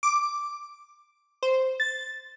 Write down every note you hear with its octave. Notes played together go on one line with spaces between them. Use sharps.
D6
C5
A6